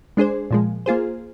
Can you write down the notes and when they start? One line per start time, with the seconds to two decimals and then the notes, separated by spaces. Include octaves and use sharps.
0.17 G#3 D4 G#4 C5
0.51 A#2 F3 G#3
0.86 A#3 F4 G#4 C5